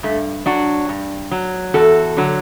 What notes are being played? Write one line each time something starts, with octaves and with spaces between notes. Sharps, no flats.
G2 A3
F#3 D4 F#4
G2
F#3
E2 F#4 A4
D3 F#3